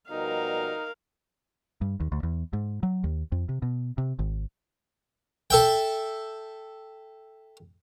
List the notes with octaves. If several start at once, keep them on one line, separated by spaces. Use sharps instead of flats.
B2 F3 G3 D#4 A#4 F5
G2
D#2
D2
E2
G#2
F#3
D#2
F2
C3
B2
C3
G#1
A4 E5 G5